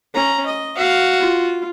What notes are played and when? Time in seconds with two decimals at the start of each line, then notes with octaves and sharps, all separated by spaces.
0.14 C#4 A#5
0.46 D#5
0.77 F#4 F5
1.20 F4